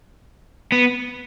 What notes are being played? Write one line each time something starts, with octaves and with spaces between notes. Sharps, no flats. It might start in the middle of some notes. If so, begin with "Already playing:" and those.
B3